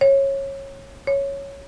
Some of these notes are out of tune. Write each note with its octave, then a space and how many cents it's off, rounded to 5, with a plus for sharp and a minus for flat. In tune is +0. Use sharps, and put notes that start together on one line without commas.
C#5 -20
C#5 +0